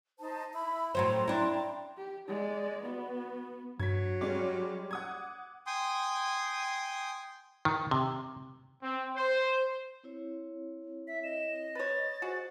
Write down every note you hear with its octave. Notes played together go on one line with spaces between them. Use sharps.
D#4 C5 A5
E4 B5
A2 F#3 C5 G5 A#5 C6
D4 E4
G4
G#3 D5
B3 F#4
G2 F#3 G#6 B6
G3 G#3 C#4 D6
F#5 D#6 G#6
G5 G#5 C6 D#6
D#3
C3
C4
C5
C4 E4 C#5
E5 B6
D#5 E7
B4 C#5 A6
F#4 G#4 C5